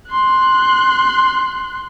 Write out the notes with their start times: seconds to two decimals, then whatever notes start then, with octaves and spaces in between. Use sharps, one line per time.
0.10 C6 F#6